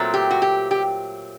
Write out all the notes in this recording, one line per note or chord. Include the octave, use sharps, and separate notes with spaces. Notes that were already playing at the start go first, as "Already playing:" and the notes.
Already playing: A#2 F#3 A3 C4
G4
F#4
G4
G4